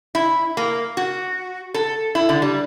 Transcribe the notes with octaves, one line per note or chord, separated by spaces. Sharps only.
E4
A#3
F#4
A4
E4
D3
G3